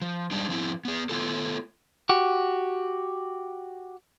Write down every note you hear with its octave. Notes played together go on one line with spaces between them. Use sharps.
F3
G3 G#3 D4 D#4
F3 C4 E4
B3 G#4
A3 B3 F4 A4
F#4 G4